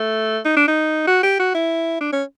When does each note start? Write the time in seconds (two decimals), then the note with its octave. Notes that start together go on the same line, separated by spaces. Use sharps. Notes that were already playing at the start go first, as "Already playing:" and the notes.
Already playing: A3
0.45 D#4
0.57 D4
0.68 D#4
1.07 F#4
1.23 G4
1.40 F#4
1.55 E4
2.01 D4
2.13 C#4